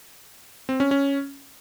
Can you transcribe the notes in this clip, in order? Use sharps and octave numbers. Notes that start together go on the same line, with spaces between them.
C4
C#4
C#4